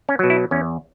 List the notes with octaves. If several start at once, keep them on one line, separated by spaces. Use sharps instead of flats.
C#4
B2 F#3
E4
E2 C#4